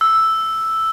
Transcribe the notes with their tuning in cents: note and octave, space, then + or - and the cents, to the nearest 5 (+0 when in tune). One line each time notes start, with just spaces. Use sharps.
E6 +0